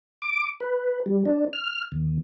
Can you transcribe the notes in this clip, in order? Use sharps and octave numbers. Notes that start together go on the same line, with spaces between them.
D6
B4
G3
D4
F6
D#2